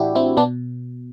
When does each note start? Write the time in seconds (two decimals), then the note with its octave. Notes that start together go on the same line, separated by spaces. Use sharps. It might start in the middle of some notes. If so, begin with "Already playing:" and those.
Already playing: A2 E3 D4 E4 F#4 G4
0.15 C4 E4
0.37 B2 B3 D4